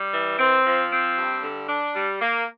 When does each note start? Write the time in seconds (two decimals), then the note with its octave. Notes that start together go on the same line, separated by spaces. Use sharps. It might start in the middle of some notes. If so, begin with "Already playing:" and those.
Already playing: G3
0.13 E3
0.39 C4
0.65 F3
0.91 C4
1.17 G2
1.42 D3
1.69 D4
1.95 G3
2.20 A#3